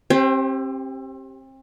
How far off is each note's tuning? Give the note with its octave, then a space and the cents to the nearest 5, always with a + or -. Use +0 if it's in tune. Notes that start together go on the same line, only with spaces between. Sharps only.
C4 +35 G4 +0 C5 -10